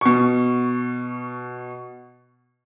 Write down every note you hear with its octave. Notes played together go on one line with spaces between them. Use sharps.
B2 C#6